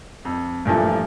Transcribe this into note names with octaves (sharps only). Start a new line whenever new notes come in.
F2
G2 A#2 E3 F3 A3